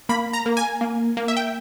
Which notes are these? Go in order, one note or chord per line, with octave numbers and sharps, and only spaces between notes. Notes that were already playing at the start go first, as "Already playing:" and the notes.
A#3 B5
A#5
A#3
G#5
A#3
A#3
E5
G5